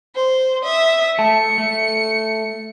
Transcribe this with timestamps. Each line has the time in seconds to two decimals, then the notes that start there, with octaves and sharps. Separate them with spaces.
0.15 C5
0.64 E5 D#6
1.19 A3 A5 C#7
1.58 A3